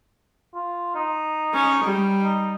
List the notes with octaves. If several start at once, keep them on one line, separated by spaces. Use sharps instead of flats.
F4
D#4
C#4 C#5
G3
D#4